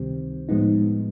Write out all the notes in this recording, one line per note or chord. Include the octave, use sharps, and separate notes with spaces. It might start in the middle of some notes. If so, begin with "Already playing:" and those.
Already playing: C#2 C3 D#3 G3 C4
A2 F3 G#3 B3 D#4